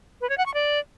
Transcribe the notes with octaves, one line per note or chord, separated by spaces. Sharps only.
B4
C#5
F#5
C#6
D5